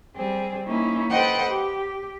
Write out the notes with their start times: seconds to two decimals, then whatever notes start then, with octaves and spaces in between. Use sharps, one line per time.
0.16 G3 C4 G#4
0.66 A#3 C#4 D#4 E4
1.10 A4 B4 C5 D#5 F#5 G5
1.48 G4